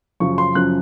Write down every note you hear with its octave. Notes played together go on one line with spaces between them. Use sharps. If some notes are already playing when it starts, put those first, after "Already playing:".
F#2 C#3 F3 C#6
C6
F#2 C#3 F3 F#6